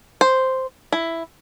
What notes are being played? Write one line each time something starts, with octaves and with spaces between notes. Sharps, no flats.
C5
E4